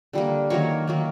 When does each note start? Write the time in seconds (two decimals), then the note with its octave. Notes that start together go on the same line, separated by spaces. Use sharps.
0.13 D3 G3 A#3
0.50 D#3 F#3 A#3 C#5
0.87 D#3 F#3 A#3